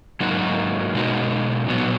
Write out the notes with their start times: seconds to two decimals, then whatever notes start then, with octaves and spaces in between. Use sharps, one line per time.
0.20 G#2 F#3 A#3 D#4 F#4
0.95 B2 G#3 D#4 F#4
1.68 A#2 F#3 B3